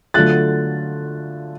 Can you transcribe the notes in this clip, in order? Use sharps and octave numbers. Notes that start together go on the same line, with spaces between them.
D3 F#3 A3 F4 F#6 A6